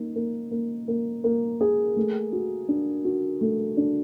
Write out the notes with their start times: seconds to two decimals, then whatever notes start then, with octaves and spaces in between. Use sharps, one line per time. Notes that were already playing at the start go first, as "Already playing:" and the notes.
Already playing: A#3 D#4
0.16 A#3
0.51 A#3
0.88 A#3
1.24 A#3
1.61 G#4
1.96 A3
2.33 F#4
2.68 D4
3.05 F#4
3.41 A3
3.77 D4